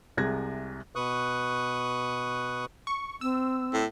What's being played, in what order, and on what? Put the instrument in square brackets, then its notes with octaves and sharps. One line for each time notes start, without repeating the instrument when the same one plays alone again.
[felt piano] C2 C3 G#3 F#6 G#6 A#6
[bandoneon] B2 B4 C#6 D#6 F#6
[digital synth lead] C#6
[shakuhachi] C4 [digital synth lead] E6
[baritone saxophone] A2